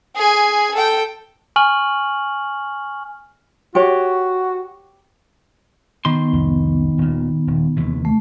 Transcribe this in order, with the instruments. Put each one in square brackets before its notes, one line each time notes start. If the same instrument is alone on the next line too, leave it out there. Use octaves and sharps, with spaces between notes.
[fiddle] G#4 G#5
A4 G5
[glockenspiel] G#5 C#6 F6 F#7
[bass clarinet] F#4 [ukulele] G4 C#5
[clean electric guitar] D#3 C6 [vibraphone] B3
[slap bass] C2 F2
D#1 A#2
D#1
D#2 C3 E3
[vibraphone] A3